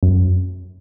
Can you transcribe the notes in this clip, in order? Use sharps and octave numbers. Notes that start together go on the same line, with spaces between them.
F#2